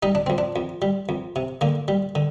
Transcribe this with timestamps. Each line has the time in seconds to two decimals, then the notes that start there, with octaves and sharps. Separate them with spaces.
0.03 G3 D#4
0.15 D4
0.27 F2 C4
0.38 D4
0.56 F2
0.82 G3
1.09 F2
1.36 C3
1.61 D3 A#3
1.88 G3
2.15 D3